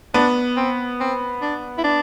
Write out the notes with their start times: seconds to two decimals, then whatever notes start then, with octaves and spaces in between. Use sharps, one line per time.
0.14 B3 D4
0.56 C4
1.00 C4
1.42 D4
1.78 E4
1.84 D4